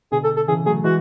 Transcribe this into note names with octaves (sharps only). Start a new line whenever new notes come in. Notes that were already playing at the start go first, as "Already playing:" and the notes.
B2 D3 G#4
A4
A4
C#3 E3 G#4
F#3 A3 G#4
E3 G#3 F#4